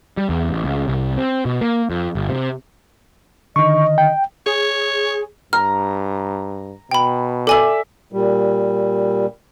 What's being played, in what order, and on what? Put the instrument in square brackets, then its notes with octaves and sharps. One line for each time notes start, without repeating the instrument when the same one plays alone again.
[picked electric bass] G3
E2
A1
C#2
C2
C4
B2
A#3
F2
G1
C3
[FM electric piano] D3 D#3 [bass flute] D#5 [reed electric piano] C#6
[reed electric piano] G5
[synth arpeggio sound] G#4 [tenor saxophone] C#5
[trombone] G2 [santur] A#5 [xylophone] F6
[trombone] B2 [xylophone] G5 B5
[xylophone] A4 G#5 F#7 [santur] D5 E5
[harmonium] A#2 G3